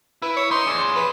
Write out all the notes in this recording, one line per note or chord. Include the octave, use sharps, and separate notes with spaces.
E4 B4
C#5
D#4 C6
G#4 D5
B4